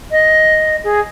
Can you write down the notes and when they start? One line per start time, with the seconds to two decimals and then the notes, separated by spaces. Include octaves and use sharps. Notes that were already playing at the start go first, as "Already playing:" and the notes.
0.11 D#5
0.84 G#4